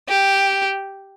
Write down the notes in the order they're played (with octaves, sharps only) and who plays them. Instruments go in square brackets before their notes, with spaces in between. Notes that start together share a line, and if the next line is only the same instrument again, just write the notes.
[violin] G4